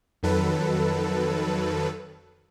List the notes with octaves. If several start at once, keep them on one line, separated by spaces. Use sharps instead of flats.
F2 D#3 F#3 A4 B4